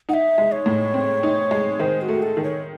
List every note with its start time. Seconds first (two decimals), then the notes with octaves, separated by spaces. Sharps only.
0.09 D#4 F#5
0.14 E5
0.38 G#3
0.52 C#5
0.66 A2
0.94 C4
1.23 D#4
1.51 G#3
1.79 D#3 C5
2.01 F#4
2.08 A3
2.23 A4
2.37 D#3
2.44 C#5